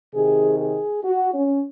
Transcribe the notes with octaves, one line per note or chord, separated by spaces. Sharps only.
C3 D#3 G#4
G#4
F#4
C#4